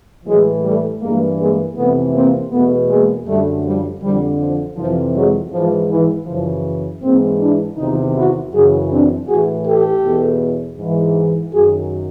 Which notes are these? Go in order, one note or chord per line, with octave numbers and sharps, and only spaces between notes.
A2 E3 F#3 G#3
G3 A3
G2 E3 G#3 A#3
G#3 A#3
F2 C3 E3 A3 B3
A#3 C4
E2 B2 A3 B3
G#3 A#3
F#2 D3 G3 A3
F3 G3
F2 D3 F3 G3
F3
F2 C3 E3 F3
F#3 G#3
G#2 E3 F3
E3
F#2 C#3 E3 F3
G#2 E3 A#3 C4
D4 E4
E2 C3 D#3 D#4 F4
E4 F#4
F#2 C#3 E3 F#4 G#4
C4 D4
A2 E3 F#4 G#4
G4 A4
E2 B2
G#2 E3
F#2 D#3 F#4 G#4